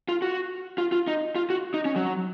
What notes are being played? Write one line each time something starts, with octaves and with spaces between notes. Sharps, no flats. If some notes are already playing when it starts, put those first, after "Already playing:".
F4
F#4
F4
F4
D#4
F4
F#4
D#4
C#4
F#3